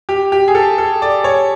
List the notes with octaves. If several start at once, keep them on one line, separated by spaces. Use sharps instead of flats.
G4
G4
G#4
A4
A4
D5
C#5